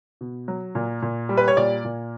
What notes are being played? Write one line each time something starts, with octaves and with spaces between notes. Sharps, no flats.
B2
F#3
A#2
A#2
G3
B4
C#5
A#2 D5
A#2